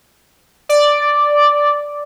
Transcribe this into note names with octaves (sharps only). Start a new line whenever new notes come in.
D5